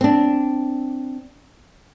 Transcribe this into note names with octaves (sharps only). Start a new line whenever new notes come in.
C4 D4